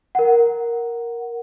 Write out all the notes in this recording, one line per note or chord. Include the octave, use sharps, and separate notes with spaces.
A#4 F#5